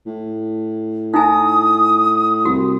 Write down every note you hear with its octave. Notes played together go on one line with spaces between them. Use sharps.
A2
D#4 E4 G#5 D#6
C2 F#4